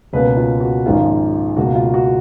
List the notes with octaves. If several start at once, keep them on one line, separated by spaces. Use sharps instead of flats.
C#2 B2 A#3 C#4 B4
F4
F#4
A#1 G#2 D#3 A#3 C#4 F4
C#2 B2 A#3 F#4
F4
F#4